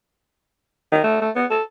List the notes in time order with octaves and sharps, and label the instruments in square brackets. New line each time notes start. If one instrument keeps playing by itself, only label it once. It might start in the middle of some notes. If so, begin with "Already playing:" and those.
[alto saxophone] D#3
A3
A3
B3
A4